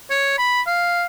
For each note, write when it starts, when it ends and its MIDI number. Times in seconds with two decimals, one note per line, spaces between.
0.10 0.37 73
0.38 0.61 83
0.67 1.05 77